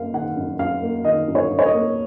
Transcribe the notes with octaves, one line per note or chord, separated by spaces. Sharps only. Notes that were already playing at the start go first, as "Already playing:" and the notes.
Already playing: F#2 A#3 F5
D#3 F#5
F#2
F#2 F5
A#3
D#3 D#5
F#2
C#5
F#2
C#5
D#5
A#3